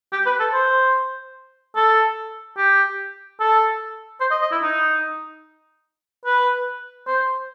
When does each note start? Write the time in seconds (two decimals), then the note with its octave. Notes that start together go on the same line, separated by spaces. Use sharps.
0.12 G4
0.26 B4
0.40 A4
0.53 C5
1.76 A4
2.57 G4
3.40 A4
4.21 C5
4.31 D#5
4.41 D#5
4.52 E4
4.62 D#4
6.25 B4
7.07 C5